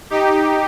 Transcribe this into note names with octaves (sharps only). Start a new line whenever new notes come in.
D#4 G4